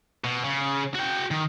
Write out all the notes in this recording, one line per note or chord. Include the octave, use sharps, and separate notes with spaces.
B2
C#3
F#4 G5
D#3